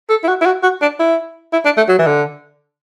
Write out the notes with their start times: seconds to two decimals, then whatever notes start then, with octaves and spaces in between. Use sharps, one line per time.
0.10 A4
0.24 E4
0.28 F#4
0.41 E4
0.46 F#4
0.63 F#4
0.82 D4
0.99 E4
1.53 E4
1.65 D4
1.77 A3
1.88 F#3
1.99 E3
2.06 D3